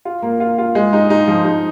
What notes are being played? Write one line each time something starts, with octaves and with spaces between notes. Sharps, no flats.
F4
A#3
F4
F4
G#3
D#4
D#4
F3
D#4